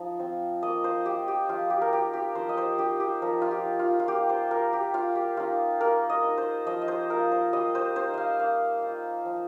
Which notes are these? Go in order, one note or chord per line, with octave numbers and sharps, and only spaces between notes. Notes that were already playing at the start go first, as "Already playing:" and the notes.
Already playing: F3 D#4
C4 F4
A#3 D#5
C5
F4 G4
G4
F3 F4
G4
A#4
D#4 G4
G4
F3 C5
D#5
C5
D#4 G4
G4
F3 A#4
F4
G4
D#4
F4
F4
A#3 G4
C5
F4 A#4
G4
G3 F4
G4
A#3 D#4 F4
A#3 A#4
D#5
D#4
C5
F3 D#5
D#5
C5
A#3 F4 A#4
C5
G3 D#5
C5
D#4 C5
D#5 F5
A#3 F5
F4
F3